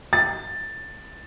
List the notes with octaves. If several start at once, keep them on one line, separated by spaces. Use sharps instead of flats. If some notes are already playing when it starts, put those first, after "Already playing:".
A6